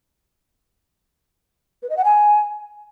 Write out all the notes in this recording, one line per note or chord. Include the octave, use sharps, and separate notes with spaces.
B4
D#5
F#5
G#5